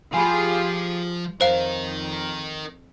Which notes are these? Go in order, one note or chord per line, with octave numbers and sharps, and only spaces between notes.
F3 F4 G4 G#4 G#5 B5
F2 D#4 A#4 C5 F5